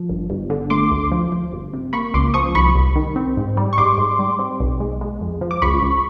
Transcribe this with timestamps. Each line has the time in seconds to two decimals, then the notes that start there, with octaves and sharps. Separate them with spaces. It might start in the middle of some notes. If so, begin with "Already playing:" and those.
Already playing: F3
0.09 G1
0.30 G1
0.50 D3
0.70 A3 C6 D6
0.91 D2
1.12 F3
1.32 F3
1.53 G1
1.73 C3
1.93 A#3 B5 C#6
2.14 C#2 C6 D6
2.34 F3 C#6 D#6
2.55 C2 B5 C#6
2.75 C2
2.96 D#3
3.16 C4
3.37 G#2
3.57 G3
3.73 C#6
3.78 G#2 C6 D6
3.98 G#2
4.19 G3
4.39 C4
4.60 B1
4.80 G#3
5.01 G#3
5.21 F2
5.41 F3
5.51 D6
5.62 C#2 B5 C#6
5.82 C#2